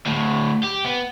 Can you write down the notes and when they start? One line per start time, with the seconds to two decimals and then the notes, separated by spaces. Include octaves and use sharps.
0.07 D2 A2
0.63 G4
0.84 B3